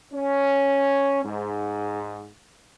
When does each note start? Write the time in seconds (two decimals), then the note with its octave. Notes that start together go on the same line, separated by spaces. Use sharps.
0.13 C#4
1.23 G#2